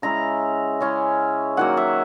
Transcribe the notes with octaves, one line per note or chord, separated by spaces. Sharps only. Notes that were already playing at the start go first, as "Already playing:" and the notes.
C#3 G#3 C#4 E4 A#5
C#3 G#3 C#4 E4
D#3 F#3 A#3 F#5
E5